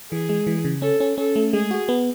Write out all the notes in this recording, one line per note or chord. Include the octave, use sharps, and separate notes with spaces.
E3 G#4
G#3
E3
C#3
C#4 A4
C#4
C#4 A4
A3
G#3 G#4
F#4
B3